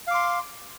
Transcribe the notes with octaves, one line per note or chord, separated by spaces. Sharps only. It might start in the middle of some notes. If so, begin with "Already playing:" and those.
F5 C6 D6